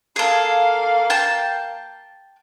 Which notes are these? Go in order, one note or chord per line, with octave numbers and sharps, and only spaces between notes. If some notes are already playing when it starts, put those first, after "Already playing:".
A#3 G#4 A4 F5
G5 A5